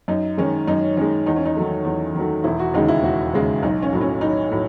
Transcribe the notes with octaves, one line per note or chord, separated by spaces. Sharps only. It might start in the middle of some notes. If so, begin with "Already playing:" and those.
F#2 D#4
D#3 G#3 C#4
F#2 D#4
D#3 G#3 C#4
E2 D#4
C#4
D#4
D#3 F#3 A3
E2
D#3 F#3 A3
E1 E4
F#4
D#2 C#3 G#3 D#4
E4
E1 F#4
D#2 C#3 G#3
B1 D#4
C#4
A2 F#3
C#4
B1 D#4
A2 F#3